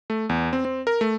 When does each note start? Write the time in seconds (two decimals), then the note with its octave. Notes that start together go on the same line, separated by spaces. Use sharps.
0.10 A3
0.29 E2
0.53 C4
0.65 C4
0.87 A#4
1.01 A3